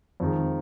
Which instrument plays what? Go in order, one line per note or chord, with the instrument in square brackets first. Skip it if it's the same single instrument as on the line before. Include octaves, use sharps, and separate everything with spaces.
[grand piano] F2 D#3 G#3